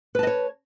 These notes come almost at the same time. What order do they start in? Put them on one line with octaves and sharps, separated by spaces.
B4 A5 D#5 C#5